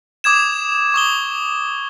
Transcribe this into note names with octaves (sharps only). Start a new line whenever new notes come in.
D6 D#6 G#6 E7
C#6 D#6 G7